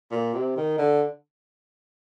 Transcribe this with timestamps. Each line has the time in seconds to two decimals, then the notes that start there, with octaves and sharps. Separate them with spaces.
0.11 A#2
0.34 C3
0.57 D#3
0.78 D3